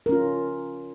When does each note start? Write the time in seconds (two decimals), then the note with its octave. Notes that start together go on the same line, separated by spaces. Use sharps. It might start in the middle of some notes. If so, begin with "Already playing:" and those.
0.06 A#4
0.09 C#4
0.12 F4